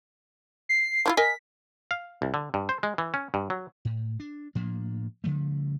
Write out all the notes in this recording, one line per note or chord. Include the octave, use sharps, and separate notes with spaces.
C7
F3 E4 F4
A#4 D#5 G#5 B6
F5
C2
D3
G2
C5
G#3
E3
C#4
G2
F#3
A2
D4
A2 F3 A#3 D4
C#3 F3 G3 A3